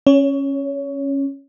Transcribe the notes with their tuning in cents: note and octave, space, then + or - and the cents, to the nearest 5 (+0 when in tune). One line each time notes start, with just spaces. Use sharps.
C#4 -10 C#5 +20